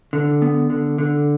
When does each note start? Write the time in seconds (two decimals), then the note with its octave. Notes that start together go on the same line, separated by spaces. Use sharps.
0.13 D3
0.42 B3
0.70 D3
0.98 D3